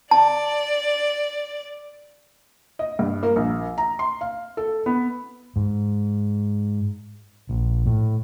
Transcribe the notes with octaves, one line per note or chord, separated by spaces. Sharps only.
D5 A5
D#5
G2
A#3
A#1
A#5
C6
F5
A4
B3
G#2
A#1
A2